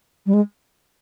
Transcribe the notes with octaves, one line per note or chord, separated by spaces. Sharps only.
G3
G#3